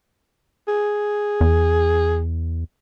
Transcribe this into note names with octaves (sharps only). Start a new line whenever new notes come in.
G#4
E2